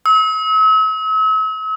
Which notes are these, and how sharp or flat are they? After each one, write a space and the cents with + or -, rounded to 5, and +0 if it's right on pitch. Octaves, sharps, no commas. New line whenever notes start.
E6 -45